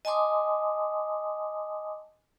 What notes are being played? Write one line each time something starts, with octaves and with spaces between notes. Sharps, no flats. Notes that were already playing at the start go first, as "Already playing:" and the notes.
D#5 G#5 A5 C6 D6 D#6